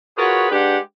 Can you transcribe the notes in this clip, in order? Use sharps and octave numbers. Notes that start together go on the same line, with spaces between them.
F4 F#4 G#4 A#4 B4 C#5
G#3 D4 G4 B4 F#5 G5